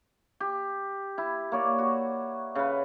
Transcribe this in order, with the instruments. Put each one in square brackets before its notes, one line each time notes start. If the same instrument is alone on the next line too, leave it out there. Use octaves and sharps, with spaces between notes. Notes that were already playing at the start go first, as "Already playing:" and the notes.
[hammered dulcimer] G4
E4
A#3 C#5 D5
F#4
C#3 B4